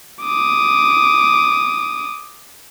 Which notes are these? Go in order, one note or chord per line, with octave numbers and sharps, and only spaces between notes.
D6 D#6